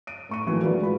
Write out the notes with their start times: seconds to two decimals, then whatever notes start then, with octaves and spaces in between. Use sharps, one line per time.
0.07 D7 D#7
0.29 A2 C#6 D#7
0.46 D#3 E3 F#3 A3 A#3
0.62 F#3 G#3 D4 F4 B4
0.81 G#2 B5